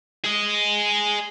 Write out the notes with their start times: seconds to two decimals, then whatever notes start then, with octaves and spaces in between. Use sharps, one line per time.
0.24 G#4 D#5